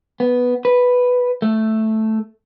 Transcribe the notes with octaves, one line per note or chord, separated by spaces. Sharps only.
B3
B4
A3